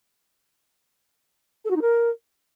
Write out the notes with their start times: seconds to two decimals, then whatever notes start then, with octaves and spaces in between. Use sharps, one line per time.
1.65 A4
1.70 F#4
1.76 D#4
1.81 A#4